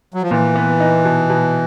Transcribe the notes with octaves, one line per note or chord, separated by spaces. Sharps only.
F#3
F3
A#2 E3
B3
D#4
B2
B2